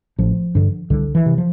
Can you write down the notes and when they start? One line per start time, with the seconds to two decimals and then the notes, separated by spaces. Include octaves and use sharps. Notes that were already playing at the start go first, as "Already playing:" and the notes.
0.18 A1 F3
0.55 G2 D3
0.90 C2 D3
1.15 E3
1.26 C3
1.38 F3